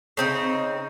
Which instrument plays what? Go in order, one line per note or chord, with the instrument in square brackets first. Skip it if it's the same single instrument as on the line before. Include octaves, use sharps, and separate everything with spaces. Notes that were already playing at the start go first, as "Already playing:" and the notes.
[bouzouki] C#3 C4 D#4